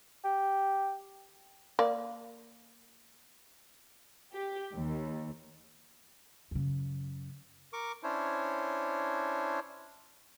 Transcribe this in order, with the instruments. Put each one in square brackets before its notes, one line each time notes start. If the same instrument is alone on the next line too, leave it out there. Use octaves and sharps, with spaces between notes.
[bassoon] G4
[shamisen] A#3 D5
[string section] G4
D#2
[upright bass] F#2 C#3
[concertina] A#4 C#6 D6
C#4 D4 E4 C5 C#5